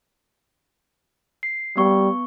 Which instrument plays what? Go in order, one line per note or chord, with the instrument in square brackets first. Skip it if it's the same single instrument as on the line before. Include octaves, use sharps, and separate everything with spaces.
[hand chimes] C7
[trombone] G3 [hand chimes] B3 C#6